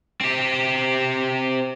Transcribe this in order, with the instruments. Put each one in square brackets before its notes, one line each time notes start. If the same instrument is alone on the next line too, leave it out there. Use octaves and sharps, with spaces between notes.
[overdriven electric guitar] C4 G4